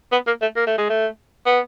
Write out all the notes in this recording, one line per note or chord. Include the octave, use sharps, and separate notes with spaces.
B3
A#3
A3
A#3
A3
G#3
A3
B3